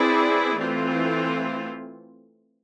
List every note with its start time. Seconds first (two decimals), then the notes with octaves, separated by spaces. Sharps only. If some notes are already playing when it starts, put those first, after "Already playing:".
Already playing: C4 E4 G#4 B4 D5
0.56 E3 A3 C4 F4